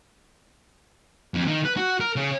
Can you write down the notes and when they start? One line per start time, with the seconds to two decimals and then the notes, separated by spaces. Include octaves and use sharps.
1.34 F2
1.47 D#3
1.65 B4
1.77 F#4
2.00 A#4
2.16 C#3